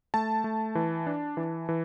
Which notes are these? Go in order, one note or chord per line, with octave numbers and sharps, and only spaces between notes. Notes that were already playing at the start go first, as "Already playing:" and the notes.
A3 A5
A3
E3
D4
E3
E3